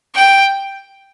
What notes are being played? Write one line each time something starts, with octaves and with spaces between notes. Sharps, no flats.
G5